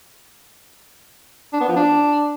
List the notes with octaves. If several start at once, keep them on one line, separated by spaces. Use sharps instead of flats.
D4
B3
F3
D4